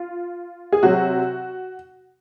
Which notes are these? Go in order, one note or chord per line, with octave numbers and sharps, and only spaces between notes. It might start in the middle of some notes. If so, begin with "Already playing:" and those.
Already playing: F4
G#4
C3 F#3 F#4